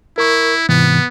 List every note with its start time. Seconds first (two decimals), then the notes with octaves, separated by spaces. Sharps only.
0.18 E4 A#4 C#6
0.69 G#2 C3 E3 B3